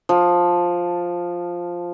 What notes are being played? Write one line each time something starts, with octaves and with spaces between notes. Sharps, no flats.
F3